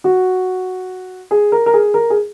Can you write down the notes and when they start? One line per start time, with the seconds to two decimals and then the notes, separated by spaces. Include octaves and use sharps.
0.04 F#4
1.31 G#4
1.52 A#4
1.66 A#4
1.73 G#4
1.94 A#4
2.10 G#4